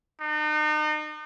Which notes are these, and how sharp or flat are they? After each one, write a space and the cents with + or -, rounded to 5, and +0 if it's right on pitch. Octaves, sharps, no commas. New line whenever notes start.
D#4 -40